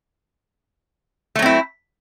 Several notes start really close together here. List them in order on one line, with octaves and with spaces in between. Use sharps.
A3 F#3 C4 E4